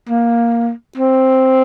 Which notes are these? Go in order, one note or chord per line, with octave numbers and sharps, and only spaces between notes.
A#3
C4